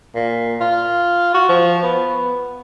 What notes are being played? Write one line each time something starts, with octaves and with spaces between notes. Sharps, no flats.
A#2
F4
F#4
F3
B3